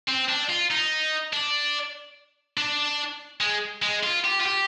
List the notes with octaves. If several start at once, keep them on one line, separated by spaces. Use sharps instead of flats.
C4
D4
F4
D#4
D4
D4
G#3
G#3
F4
G4
F4
G4